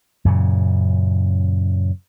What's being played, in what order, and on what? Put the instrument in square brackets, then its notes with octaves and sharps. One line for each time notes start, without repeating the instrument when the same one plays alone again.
[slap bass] F#2 A#2 C#3